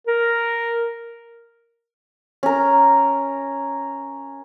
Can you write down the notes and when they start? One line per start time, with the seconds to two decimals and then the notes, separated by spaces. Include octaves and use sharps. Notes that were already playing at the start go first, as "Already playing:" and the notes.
0.07 A#4
2.43 C#4 A#4